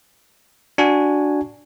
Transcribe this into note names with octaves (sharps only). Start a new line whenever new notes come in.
D4 F#4 G#5